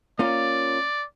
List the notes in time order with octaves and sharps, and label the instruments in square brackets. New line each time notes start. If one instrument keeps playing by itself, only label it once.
[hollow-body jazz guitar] A#3 C#4 F4 [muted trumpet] D5